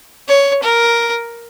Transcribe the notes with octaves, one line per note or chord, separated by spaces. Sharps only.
C#5
A#4